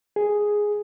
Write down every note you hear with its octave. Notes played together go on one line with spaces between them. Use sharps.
G#4